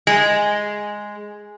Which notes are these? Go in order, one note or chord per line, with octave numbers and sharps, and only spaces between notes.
G#3